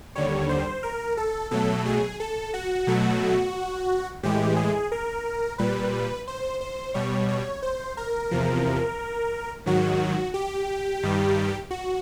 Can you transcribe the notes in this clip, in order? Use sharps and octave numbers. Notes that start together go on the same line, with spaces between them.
D#2 D3 G3 C#5
C5
A#4
A4
B2 F#3 A3 A4
G#4
A4
F#4
B2 F#3 A3
A2 E3 G#3 G4
G#4
A#4
A#2 G3 B4
C5
C5
B2 G3 C#5
C#5
C5
A#4
E2 C3 F3
G#2 D#3 F#3 F#4
G4
G2 D#3 G3
F#4